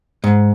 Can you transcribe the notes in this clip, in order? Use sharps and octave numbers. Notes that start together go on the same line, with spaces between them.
G#2